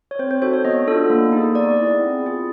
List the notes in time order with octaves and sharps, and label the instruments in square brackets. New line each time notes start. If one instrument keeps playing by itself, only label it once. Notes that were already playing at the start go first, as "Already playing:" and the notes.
[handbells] C#5
C4 C5
C5
D#4 F#4 A4 C5
C#5
B3 D#5
D4 F4 A4
A#3
D#4 G#4
B3 D5
E4 G#4
C4
F4 G#4